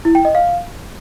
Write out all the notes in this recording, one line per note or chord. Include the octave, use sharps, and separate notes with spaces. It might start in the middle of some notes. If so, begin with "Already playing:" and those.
E4
G5
D#5
F5